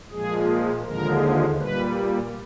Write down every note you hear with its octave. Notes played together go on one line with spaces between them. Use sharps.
A#2 F3 G#3 G#4
D#2 D3 F3 G#3 A#4
A#2 G3 B4